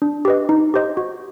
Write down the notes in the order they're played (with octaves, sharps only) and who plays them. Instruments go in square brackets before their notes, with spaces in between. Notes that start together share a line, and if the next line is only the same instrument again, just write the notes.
[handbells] D4
G4 B4 D#5
D#4
G4 C5 D#5
F#4